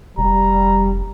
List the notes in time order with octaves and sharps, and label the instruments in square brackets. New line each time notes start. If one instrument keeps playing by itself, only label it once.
[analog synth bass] F1 [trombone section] G3 [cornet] A#5